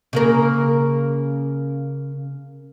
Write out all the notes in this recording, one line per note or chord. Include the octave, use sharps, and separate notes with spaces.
C#3 A#3 A#4